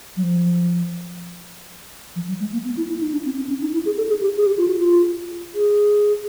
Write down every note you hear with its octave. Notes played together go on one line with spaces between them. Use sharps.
F#3
F3
F3
F#3
G#3
A#3
B3
E4
E4
D#4
D4
C4
C4
C#4
D#4
E4
G#4
A4
G#4
G4
G#4
G4
F4
F#4
F4
G#4